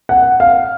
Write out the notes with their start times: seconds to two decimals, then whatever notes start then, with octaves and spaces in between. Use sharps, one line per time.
0.09 F#5
0.40 F5